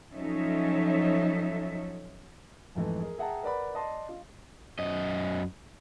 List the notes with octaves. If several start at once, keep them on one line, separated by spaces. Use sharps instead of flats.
F3 F#3 C#4 D#4 A4 E5
F2 G#2 E3 A3
G#4 A#4
G#4 E5 F#5 G5 A5 A#5
A#4 B4 D5 F#5 B5
D5 D#5 A5 C6
F4
F#2 D#5